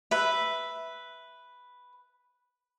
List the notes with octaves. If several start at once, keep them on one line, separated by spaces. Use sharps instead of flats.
B4 E5